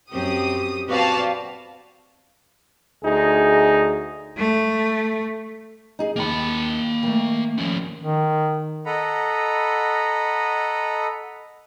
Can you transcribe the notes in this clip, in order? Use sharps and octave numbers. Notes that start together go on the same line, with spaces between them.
F#2 C4 G4 D#6
C4 F#4 B4 D5 F5 A5
D2 D#4 G#4
A3
D#4 G#4
D#2 D#3 A#3 A5 B5
D#3 A3
F3 C#4
D#3
A4 D#5 F#5 A#5 B5